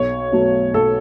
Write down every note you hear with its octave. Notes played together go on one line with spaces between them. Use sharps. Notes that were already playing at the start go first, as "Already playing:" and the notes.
Already playing: B1 C#5
B2 F#3 A3
B1 A4